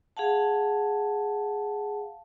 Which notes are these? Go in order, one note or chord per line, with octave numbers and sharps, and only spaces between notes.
G#4 F5 F#5 A5